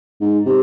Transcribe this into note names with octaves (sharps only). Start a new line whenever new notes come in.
G#2
C3